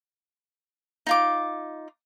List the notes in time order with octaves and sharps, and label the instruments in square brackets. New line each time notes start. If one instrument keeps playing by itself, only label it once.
[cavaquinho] D#4 F4 D6